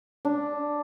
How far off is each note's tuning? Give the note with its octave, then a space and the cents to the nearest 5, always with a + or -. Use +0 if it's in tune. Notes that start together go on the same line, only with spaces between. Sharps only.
D4 +0